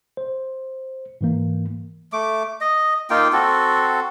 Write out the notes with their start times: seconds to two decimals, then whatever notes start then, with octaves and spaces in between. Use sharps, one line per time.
0.17 C5
1.21 G#2 E3 A#3
2.13 A3 D6
2.61 D#5
3.10 A#3 D#4 F4 G5
3.33 C4 F#4 A4